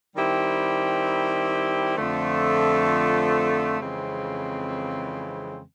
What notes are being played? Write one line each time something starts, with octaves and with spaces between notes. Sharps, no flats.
D#3 G3 C4 E4 G4
F2 D3 F3 A3
F2 C#3 E3 G#3 C4